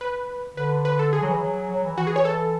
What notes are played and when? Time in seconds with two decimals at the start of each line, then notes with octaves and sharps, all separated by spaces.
0.01 B4
0.56 D3 B4
0.85 B4
0.99 A4
1.13 G#4
1.21 F#3
1.29 E3
1.37 F#3
1.69 F#3
1.84 E3
1.97 E3 F#4
2.07 G#4
2.16 C#5
2.25 A4